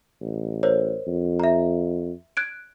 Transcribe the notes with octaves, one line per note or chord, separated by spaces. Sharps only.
A1
A#4 C5 C#5
F2
E5 A#5
F#6 G#6 D7